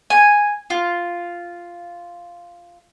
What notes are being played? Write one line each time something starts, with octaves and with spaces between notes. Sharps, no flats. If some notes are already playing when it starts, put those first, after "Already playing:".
G#5
F4